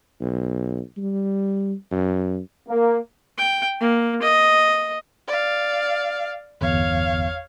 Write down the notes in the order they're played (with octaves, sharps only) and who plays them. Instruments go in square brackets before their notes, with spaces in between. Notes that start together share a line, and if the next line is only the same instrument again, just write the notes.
[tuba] B1
G3
F#2
[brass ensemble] A#3
[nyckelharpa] G5
A#3
D#5
[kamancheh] D5 F5
[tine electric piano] G1 E2 [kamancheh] C#5 F5